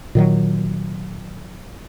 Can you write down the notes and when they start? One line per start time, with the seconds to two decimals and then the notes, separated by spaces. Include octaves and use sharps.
0.15 A#2 D#3 F#3